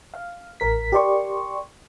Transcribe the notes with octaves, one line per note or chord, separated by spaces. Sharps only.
F5
A1 A#4 B6
G4 A#4 D5 C6 C#6